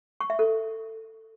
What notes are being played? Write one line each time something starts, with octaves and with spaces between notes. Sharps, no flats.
C#6
E5
A4